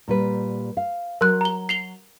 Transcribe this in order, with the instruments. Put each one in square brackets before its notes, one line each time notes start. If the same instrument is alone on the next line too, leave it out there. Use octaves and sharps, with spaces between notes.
[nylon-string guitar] A#2 G3 B4
F5
[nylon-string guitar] F#3 [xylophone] A#4 C6 F#6
[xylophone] A#5 G7
C7 F7 G7